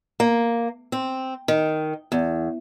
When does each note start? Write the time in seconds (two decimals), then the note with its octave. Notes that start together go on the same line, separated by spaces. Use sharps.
0.20 A#3
0.92 C4
1.48 D#3
2.12 E2